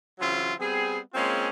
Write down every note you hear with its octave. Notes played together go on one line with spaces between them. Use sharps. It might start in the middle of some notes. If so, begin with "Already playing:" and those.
C#3 E3 F#3 C4 C#4 F4
G3 B3 C4 G#4
G#3 A#3 C4 C#4 F4 G#4